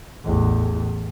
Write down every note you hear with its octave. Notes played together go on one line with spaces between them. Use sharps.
A1 E2